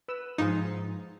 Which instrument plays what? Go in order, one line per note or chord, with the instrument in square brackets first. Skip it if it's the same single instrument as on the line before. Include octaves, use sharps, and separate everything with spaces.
[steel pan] B4 E6
[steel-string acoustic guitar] G#2 F3 [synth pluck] D#4 [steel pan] F4 G#4